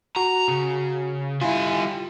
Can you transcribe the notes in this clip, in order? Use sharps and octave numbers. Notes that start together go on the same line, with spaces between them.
F#4 A#5
C#3
G3 E4 F4 G#5